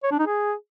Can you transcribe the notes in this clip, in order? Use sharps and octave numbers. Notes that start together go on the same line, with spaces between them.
C#5
D4
D#4
G#4